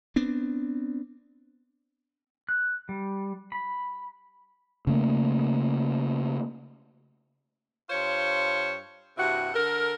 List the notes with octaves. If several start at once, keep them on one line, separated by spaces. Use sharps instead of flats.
B3 C4 D4
F#6
G3
B5
C#3 A3 A#3
G2 F4 C5 C#5
G2 C3 E4 F#4 F#5
D3 A4 A#4